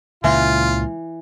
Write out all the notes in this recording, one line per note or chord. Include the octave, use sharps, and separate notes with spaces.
C#2 A#2 C#3 E3 F4